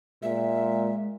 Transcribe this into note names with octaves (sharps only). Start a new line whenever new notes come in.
A#2 G#3 E5